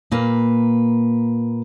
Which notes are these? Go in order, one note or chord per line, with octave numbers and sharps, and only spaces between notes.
A#2 A#3 B4